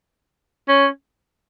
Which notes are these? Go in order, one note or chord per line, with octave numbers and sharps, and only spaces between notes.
C#4